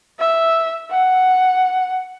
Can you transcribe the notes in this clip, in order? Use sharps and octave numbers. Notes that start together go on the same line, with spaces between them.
E5
F#5